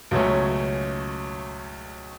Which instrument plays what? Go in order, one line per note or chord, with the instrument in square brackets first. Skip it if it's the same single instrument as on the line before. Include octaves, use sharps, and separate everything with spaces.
[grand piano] C#2 B2 F#3 A3 C#4